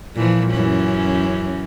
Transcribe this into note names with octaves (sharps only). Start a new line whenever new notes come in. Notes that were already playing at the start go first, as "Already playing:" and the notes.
A#2 E3 F3
F#2 E3 C#4